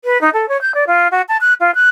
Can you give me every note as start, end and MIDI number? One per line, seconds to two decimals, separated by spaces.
0.04 0.20 71
0.21 0.29 63
0.33 0.48 69
0.48 0.60 73
0.61 0.74 91
0.74 0.84 74
0.87 1.07 65
1.11 1.22 66
1.28 1.37 81
1.40 1.53 90
1.60 1.73 65
1.74 1.89 90